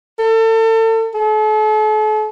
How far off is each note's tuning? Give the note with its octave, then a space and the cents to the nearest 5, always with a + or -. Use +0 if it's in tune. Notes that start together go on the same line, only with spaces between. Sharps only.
A4 +35
A4 -40